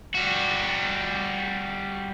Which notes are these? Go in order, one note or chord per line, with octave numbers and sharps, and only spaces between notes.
G3 F#4